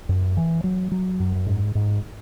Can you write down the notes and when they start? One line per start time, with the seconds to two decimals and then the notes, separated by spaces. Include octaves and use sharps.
0.09 F#2
0.37 E3
0.64 F#3
0.92 F#3
1.20 F#2
1.46 G#2
1.75 G#2